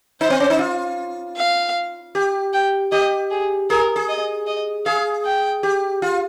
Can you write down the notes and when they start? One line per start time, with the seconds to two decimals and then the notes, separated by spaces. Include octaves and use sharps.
0.21 D#4 C5
0.30 C4
0.40 C#4
0.50 D#4
0.59 F4
1.37 F5
2.15 G4
2.53 G5
2.92 G4 D#5
3.31 G#4
3.70 G#4 A#4
3.96 G#4
4.09 D#5
4.47 D#5
4.86 G#4 F5
5.25 G5
5.63 G4
6.02 F4